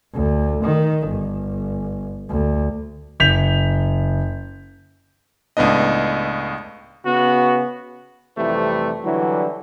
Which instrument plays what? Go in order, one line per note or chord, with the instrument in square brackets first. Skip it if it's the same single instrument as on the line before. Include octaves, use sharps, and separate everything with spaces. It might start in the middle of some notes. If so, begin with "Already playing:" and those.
[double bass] D2
D#3
G1
D2
[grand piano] F#1 G6 B6 F7
[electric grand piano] C#2 A2 B3 D4 D#5
[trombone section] C#3 B3 [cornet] F#4
[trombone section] F2 C3 E3 G3 A3 E4
D3 E3 F#3 G3 E4